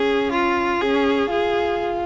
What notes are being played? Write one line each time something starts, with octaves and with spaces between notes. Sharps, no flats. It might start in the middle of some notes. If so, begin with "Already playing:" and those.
Already playing: C#4 G#4
F4
C#4 G#4
F4 G#4